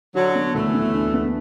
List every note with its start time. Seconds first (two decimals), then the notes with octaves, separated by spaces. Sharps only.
0.15 D3 F#3 F#4
0.35 B3
0.55 D2 E3 A3
0.74 B3
0.94 D4
1.14 B3